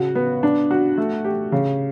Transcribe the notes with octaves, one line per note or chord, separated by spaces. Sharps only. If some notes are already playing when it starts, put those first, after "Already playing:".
Already playing: C#3 F#4
B3
D4
F#4
A3
G4
C#3